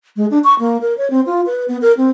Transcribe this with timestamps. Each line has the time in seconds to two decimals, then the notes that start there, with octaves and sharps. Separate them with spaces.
0.16 G#3
0.31 D4
0.44 C#6
0.59 A#3
0.81 A#4
0.98 C#5
1.10 C4
1.26 F4
1.46 B4
1.68 B3
1.81 A#4
1.97 C4